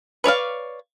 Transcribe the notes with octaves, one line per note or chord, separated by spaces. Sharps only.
B4 C#5 D5 F5